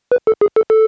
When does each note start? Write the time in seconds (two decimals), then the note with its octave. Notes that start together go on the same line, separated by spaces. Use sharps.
0.12 B4
0.27 A4
0.41 G#4
0.56 A4
0.70 A4